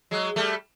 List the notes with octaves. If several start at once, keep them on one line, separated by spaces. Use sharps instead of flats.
F#3 G#3
G3 A3